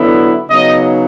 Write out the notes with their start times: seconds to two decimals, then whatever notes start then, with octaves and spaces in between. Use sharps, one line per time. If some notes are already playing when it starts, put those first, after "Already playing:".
Already playing: D3 F#3 B3 E4
0.49 C#3 F#3 B3 D#4 D#5